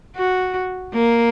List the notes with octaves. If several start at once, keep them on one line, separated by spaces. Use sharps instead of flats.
F#4
A#3